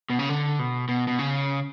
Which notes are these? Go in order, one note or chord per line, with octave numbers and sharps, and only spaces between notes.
B2
C#3
D3
B2
B2
B2
C#3